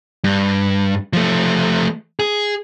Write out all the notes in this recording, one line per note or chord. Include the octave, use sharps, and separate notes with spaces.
G2
F3 A3
G#4